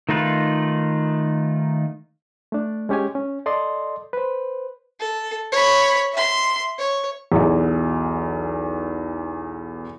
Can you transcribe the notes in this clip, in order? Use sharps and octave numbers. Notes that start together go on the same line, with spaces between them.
D#3 A3 D#4 F4 B4
A3 D4
G#3 C#4 G4 C#5 G#5
C#4
A4 D5 D#5 C6
B4 C5
A4
C#5 B5
E5 C6
C#5
B1 E2